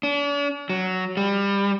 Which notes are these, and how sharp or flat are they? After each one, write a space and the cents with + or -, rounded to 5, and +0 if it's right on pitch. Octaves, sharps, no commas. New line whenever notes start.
D4 -45
F#3 +5
G3 +25